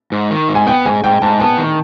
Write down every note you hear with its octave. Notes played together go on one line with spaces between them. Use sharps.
G#2
D#3
G#2
G#5
B3 G5
G#2 G#5
G#2 G5
G#2 A5
B3 A5
D#3